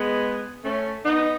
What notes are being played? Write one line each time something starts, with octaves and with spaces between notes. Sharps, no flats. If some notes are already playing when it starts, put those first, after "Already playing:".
Already playing: G#3 B3
A3 C#4
B3 D#4